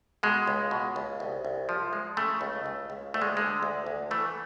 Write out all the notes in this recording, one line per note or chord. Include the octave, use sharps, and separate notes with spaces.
B2 G#3
C#2
B2
C#2
C2
C2
F3
G#3
C#3 A3
C#2
C#2
C#2
D2 A3
G#3
D3 G#3
D2
D2
E3 A3